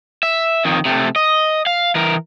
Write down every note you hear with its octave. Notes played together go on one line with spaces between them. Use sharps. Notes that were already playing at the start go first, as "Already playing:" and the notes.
E5
F2 D#3
C3 A3
D#5
F5
E3 A#4